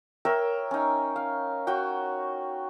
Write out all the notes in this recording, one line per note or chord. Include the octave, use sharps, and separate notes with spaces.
A#4 C#5 E5 G5
C#4 D#4
F5
F#4 C#5 G5